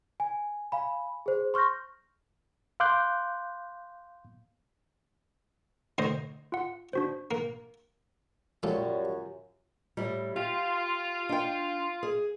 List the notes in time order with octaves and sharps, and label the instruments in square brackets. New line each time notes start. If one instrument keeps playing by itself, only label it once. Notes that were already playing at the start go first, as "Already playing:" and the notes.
[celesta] G#5
F5 G#5 B5
G#4 C5
C6 C#6 F6 G6 A#6
[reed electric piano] F5 C6 D6 F#6 G6
[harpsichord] D2 C5 D#5
[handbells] F4 F#5
D4 F#4 C5
[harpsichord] A#3
[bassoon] F#2 [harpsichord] A#2 A4 [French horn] G3 [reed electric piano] F4 G4 C#5
[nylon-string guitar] A2 G3
[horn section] F4 [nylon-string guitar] G4
[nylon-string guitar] D4 G5
G#4